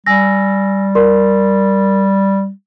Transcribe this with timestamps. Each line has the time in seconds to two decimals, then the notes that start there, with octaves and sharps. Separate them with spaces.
0.06 G3 G#5 E6 A#6
0.95 A#4 D5 C6